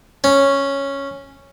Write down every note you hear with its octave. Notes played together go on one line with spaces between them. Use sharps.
C#4